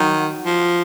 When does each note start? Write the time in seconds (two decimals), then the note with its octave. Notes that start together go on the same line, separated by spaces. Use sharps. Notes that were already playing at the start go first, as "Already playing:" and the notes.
Already playing: D#3 F#3
0.45 F3